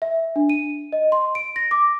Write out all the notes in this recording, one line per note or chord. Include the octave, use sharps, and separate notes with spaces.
E5
D4
D#7
D#5
C6
D7
A#6
D6